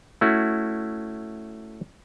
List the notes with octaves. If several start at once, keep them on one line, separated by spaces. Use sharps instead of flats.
A3 C#4 E4 F#4